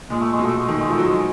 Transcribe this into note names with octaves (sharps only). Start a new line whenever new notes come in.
A#2 G#3
A3
B2 G#3
A3
G#3
D#3 A3
G#3
F3
A3
F#3
G#3